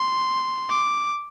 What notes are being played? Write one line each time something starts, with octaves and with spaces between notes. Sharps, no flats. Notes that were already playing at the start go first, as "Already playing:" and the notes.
Already playing: C6
D6